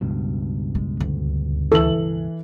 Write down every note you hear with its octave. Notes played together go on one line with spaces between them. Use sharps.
C#2 G2 B2
G#3
D2
E3 A4 F#7